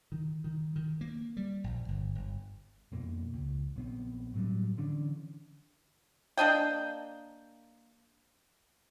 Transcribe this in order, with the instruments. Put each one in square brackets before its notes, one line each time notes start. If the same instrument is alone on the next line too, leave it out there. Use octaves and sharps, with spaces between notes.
[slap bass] D#3
D#3
D#3
A#3
G3
A#1
G1
G1
[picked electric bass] F2 B2 A#3
C#2
A#1 B3 C4
A2 F#3 G3
D3 E3 C#4 D4
[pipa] A#3 D4 D#5 G5